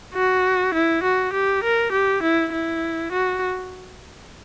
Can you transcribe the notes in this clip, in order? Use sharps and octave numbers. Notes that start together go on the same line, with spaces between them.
F#4
E4
F#4
G4
A#4
G4
E4
E4
F#4